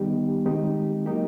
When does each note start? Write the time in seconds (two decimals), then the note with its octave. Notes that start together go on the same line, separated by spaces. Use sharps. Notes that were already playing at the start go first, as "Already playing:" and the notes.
Already playing: D#3 G3 B3 D#4 G4
0.45 D#3 G#3 C4 D#4 G4
1.06 F#3 A#3 D#4 G4